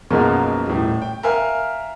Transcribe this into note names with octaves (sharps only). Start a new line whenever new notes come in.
B1 F#2 B2 F3 G#3 A#3
D#1 A2
G5
A#4 E5 F5 G#5 F6